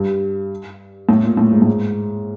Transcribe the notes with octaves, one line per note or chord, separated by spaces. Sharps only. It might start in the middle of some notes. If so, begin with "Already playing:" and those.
Already playing: G2
A2
A#2
A2
G#2
A2
G#2